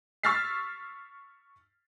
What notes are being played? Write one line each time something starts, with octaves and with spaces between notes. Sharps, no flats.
C#6 E6 F6 A6 B6 C7